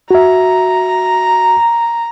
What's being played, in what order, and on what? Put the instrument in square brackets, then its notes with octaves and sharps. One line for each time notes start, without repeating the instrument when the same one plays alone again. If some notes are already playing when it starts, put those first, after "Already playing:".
[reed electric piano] F#4 E5 [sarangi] A#5